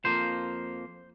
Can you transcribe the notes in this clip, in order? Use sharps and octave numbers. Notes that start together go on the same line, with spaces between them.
F2 F3 A#3 C5